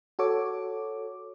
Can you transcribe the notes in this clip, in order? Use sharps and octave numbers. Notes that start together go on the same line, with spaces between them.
F#4 A4 C#5 D6